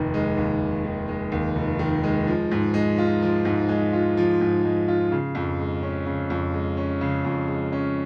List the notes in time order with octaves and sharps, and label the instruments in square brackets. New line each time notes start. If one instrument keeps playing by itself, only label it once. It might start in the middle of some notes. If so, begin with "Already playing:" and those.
Already playing: [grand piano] F1 D#2 D#3
G#3
D#2
F1
D#3
G#3
D#2
F1
D#3
G#3
F3
G#2
G#3
F4
F3
G#2
G#3
F4
F3
G#2
G#3
F4
C#3
F2
G#3
C#4
C#3
F2
G#3
C#4
C#3
F2
G#3
C#4